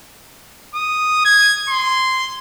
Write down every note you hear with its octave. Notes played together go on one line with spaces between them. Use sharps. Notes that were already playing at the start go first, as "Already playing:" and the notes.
D#6
G#6
C6